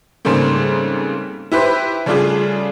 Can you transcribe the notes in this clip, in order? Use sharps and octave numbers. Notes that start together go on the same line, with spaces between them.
G#2 C#3 G3 A3 A#3 C4
E4 G4 B4 C5
C#3 G3 A3 D4 F4 G#4